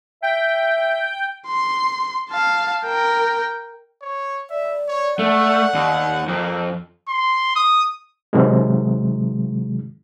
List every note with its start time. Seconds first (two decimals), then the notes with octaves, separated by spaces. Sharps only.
0.23 E5 G5
1.48 C6
2.30 F5 A5
2.85 A#4 G5
4.02 C#5
4.50 D5 E5
4.88 C#5
5.19 A3 F#5
5.74 D#2
6.28 F2 A#3
7.08 C6
7.56 D#6
8.33 C3 D#3 F#3 G#3